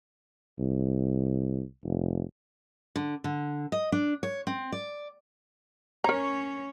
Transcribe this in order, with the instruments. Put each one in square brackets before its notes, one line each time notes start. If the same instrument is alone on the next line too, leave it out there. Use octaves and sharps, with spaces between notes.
[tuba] C2
F1
[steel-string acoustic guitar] D3
D3
D#5
D4
C#5
C4
D5
[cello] C#4 C#5 [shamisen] A#4 A#5